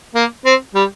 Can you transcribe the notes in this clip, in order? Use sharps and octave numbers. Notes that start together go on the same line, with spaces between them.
A#3
C4
G3